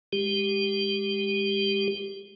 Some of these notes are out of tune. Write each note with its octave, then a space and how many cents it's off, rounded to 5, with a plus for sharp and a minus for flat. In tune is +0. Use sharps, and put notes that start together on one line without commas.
G#3 -15 G4 +0